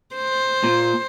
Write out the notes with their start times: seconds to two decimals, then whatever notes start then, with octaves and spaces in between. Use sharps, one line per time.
0.16 C5
0.64 A#2